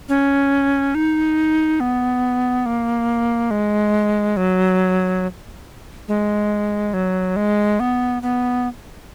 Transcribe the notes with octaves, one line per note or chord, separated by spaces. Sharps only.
C#4
D#4
B3
A#3
G#3
F#3
G#3
F#3
G#3
B3
B3